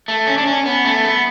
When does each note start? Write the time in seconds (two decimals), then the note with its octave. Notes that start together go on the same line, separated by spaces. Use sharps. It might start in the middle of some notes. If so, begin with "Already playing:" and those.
0.08 A3
0.27 C#4
0.38 D4
0.46 C#4
0.66 B3
0.85 A3
1.04 B3